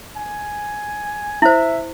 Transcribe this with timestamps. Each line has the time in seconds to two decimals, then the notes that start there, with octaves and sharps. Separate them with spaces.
0.17 G#5
1.42 E4 C5 E5